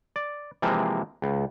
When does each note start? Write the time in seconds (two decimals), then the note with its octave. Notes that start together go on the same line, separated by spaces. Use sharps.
0.16 D5
0.62 C3 E3 F3 G#3 A#3 C4
1.22 C#2